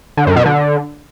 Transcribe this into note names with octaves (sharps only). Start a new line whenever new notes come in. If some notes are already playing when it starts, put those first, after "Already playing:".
D3
F#2
B2
D3